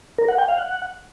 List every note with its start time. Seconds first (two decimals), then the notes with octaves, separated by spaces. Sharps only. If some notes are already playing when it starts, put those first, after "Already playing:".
0.18 A#4
0.28 F#5
0.38 G5
0.48 F5
0.58 F#5